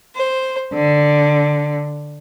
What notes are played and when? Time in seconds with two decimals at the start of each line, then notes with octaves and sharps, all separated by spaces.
0.16 C5
0.74 D3